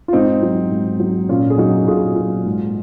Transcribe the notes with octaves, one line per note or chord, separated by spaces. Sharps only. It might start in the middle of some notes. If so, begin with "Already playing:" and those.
F4
G#2 C4 D#4
F#3
G#2
F#3
A#2 C#4 F4
G#4
F#3 D#4 F#4
A#2 F4 G#4
F#3
G#2